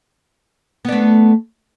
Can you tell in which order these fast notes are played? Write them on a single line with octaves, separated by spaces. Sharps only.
B3 D4 A3